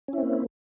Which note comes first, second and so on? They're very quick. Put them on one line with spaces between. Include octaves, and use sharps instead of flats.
C#4 E4 C4 A#3